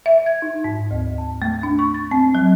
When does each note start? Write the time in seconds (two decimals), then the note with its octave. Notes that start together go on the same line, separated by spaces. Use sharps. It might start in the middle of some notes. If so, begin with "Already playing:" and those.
0.06 E5
0.26 G#6
0.42 D#4
0.64 G#2
0.91 D2
1.18 A5
1.42 A3
1.63 D4
1.79 C#6
1.94 A6
2.11 C4
2.35 F#3